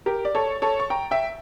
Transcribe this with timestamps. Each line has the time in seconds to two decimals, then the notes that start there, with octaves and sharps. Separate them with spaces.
0.06 G4 A#4
0.25 D5
0.35 A4 C#5
0.62 A4 C#5
0.80 C#6
0.90 G5 A#5
1.11 E5 G5